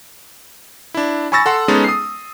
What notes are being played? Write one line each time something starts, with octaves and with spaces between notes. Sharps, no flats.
D4 E4
G#5 B5 C#6 E6 A6 A#6
A4 F#5 C6
G#3 B3 C#4 D#4 G#4 A4
D#6 C7